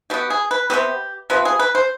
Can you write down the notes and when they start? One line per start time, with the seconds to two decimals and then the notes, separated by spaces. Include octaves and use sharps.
0.10 B2 B3 G4
0.30 G#4
0.51 B4
0.70 C3 D#3 B3 G4
1.30 C3 F3 B3 B4
1.45 G#4
1.59 B4
1.75 C5